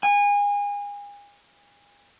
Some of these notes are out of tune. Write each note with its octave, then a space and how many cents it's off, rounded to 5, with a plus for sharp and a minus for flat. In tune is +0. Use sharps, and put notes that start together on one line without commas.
G#5 -30